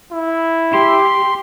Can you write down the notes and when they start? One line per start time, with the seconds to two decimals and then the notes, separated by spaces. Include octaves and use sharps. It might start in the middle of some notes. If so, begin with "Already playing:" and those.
0.12 E4
0.73 G4 C6